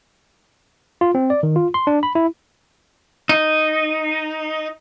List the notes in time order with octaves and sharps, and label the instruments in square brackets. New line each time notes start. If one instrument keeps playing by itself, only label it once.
[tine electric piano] F4
C4
D5
D#3
F4
C6
D4
B5
E4
[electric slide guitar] D#4